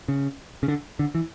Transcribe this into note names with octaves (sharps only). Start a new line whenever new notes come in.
C#3
C#3
D3
D3
E3